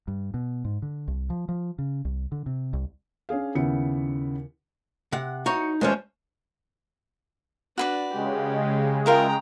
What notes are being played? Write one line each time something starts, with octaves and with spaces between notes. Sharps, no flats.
G2
B2
G#2
D3
C2
F3
F3
C#3
C2
D3
C3
C2
C#4 D4 G#4 F5
D#2 C#3 B3 E4 C#7
C3 F#5
D#4 F#4 C#5
D#2 F3 G#3 C#4 C5 C#5
D4 F#4 B4 D5
C#3 G#3 G4
F4 A#4 E5 G5 A#5